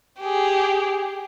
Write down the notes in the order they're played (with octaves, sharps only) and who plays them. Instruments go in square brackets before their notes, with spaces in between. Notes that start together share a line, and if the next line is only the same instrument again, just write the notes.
[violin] G4 G#4